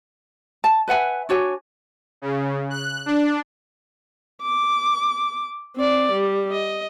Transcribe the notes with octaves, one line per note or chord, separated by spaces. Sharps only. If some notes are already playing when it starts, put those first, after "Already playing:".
A5
B4 E5 F#5 G#5
D4 F#4 C#5 G#5
C#3
F#6
D4
D6
C4 D5
G3
D#5